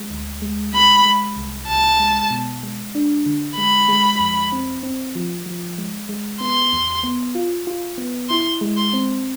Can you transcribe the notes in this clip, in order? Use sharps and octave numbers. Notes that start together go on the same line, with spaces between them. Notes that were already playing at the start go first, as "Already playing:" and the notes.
Already playing: G#3
D2
G#3
G#3 B5
G#3
C2
C2 A5
G#3
B2
G#3
D4
D3
G#3 B5
G#3
F2
C4
C4
F3
F3
G#3
G#3
B3 C6
E2
B3
F4
F4
B3
E4 C6
G#3
C6
C4